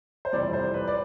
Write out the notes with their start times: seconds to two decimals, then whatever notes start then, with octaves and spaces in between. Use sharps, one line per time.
0.25 C5
0.33 F2 C3 E3 G3 D5
0.53 C5
0.74 B4
0.88 D5